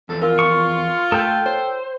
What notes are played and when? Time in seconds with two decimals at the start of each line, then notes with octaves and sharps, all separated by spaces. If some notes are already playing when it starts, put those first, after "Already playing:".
0.09 E2 F3 A3 B3 A4
0.22 F4 A#4 F5
0.39 C#6
1.12 A3 A4 G5
1.46 C5 C#5